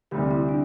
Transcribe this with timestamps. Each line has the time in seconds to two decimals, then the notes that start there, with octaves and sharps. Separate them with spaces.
0.11 D2 C3 G3 C4 G4
0.31 E4
0.49 D4